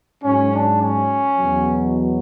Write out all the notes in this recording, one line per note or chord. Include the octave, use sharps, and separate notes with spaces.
G#2 F#3 C#4
D4
C#4
E2 B2 F#3